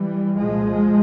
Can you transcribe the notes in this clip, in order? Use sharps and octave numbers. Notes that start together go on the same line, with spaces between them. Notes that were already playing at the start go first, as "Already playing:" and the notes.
Already playing: E3 G3
C2 A#2 F3 G#3